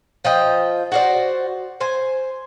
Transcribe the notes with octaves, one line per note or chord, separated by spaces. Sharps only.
F3 D#5 G5
F#4 C5 D5
C5 G#5